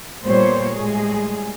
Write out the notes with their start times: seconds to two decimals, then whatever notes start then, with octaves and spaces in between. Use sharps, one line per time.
0.24 A#2 G3 B3 C5 C#5
0.75 A2 G3 G#3 G#4